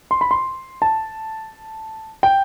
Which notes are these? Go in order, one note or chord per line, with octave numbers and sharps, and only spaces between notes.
C6
B5
C6
A5
G5